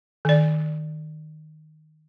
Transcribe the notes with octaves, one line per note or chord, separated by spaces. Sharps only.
D#3 D5